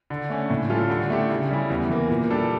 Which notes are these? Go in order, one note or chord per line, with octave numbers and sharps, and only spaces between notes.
D3
A3 C#4
A2
G3 C#4 F4 A4
D3
A3 E4 G4
C#3
G3 C#4 E4
E2
E3 A#3
A#2
G3 D4 A4